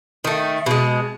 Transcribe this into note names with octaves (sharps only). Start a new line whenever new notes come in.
D#3 A3
B2 G#3